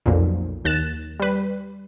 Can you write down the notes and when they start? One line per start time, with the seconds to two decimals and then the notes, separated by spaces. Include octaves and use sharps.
0.06 B1 F2 A#2
0.65 D#2 F#6 A6 E7
1.20 G3 B4